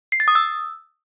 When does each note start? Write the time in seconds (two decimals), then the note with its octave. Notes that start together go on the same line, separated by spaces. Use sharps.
0.12 C7
0.20 A6
0.28 D#6
0.35 E6